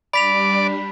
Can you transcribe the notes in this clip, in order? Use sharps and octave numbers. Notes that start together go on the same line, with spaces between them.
G3 D4 D5 B5 B6 F7